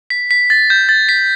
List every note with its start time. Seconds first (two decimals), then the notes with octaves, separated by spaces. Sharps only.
0.10 B6
0.31 B6
0.50 A6
0.70 G6
0.89 A6
1.09 B6